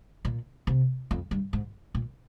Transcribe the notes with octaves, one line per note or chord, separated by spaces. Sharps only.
A#2
C3
F2
G2
G#2
A#2